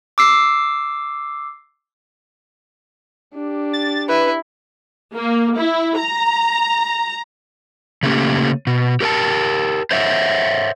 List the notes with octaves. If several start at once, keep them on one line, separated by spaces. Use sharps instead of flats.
D6 E6 C7
D4 G4
A6
E4 B4
A#3
E4
A#5
C#3 A3 A#3 C#4 G4
B2
G4 A#4 C5 G5 A5
C5 C#5 E5 F#5